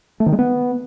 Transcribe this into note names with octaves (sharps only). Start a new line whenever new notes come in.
A3
D#3
G#3
B3